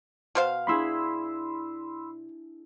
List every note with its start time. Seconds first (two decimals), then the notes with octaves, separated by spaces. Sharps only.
0.35 B2 C5 F5 F6
0.67 D4 E4 G#4 B5 C6 E6